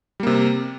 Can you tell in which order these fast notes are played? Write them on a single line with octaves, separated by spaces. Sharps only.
G3 A#3 C3